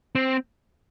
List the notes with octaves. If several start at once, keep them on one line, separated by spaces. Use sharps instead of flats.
C4